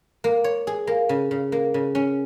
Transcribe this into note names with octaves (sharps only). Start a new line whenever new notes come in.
A#3
C#5
G#4
A#3
C#3
C#3
A#3
C#3
C#4